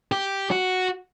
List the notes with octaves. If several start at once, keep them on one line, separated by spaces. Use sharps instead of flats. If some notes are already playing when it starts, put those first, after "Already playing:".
G4
F#4